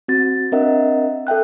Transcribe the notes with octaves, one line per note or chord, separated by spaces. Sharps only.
C4 F#4 A6
C4 D4 A#4 D#5 E5 F#5
A4 E5 G5 F#6